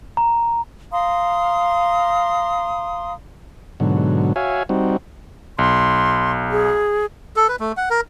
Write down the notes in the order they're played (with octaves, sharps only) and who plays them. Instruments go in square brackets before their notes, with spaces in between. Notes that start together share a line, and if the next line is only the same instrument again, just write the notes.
[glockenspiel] A#5
[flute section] F5 A#5 C6 D#6
[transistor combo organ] G#2 B2 D3 F#3
F#4 C#5 E5 F5 G#5
G3 C4 D#4 F#4
[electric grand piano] B1 [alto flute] C6
[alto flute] G#4
[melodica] A4
B4
A3
F#5
A#4